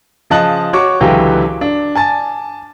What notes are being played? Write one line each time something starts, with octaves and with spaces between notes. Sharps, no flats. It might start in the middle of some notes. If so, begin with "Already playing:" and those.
C#3 F3 D#5 A5 F#6 F#7
F#4 C#5 C#6 D6
C#2 D3 E3 F#3 G4 G5
D4
G#5 A5 A6